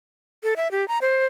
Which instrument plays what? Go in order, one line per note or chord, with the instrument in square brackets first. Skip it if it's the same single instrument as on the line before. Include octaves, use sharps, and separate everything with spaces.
[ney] A4
E5
G4
A#5
C5